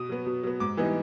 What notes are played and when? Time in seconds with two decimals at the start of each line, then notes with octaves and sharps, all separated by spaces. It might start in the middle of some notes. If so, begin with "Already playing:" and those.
Already playing: B2 D#6
0.09 F#3 B3
0.26 B2
0.43 F#3 B3
0.60 G#2 D6
0.77 E3 G3 B3 D#4